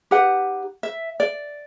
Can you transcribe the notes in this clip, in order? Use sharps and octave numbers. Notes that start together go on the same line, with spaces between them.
D#4 G4 B4 F#5
E5
D5